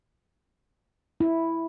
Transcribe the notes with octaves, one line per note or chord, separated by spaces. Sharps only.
E4